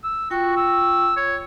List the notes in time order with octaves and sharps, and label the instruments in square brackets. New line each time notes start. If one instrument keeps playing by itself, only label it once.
[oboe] E6
[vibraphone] F4 G5 C#6 [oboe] F#4
[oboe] E6
C#5